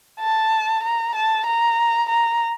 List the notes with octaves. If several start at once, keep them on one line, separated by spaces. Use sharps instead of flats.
A5
A#5
A5
A#5
A#5